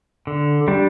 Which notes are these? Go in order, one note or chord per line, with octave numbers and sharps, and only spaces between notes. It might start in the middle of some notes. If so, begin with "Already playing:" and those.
D3
G3 D4